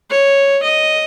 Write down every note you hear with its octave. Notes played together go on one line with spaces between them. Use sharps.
C#5
D#5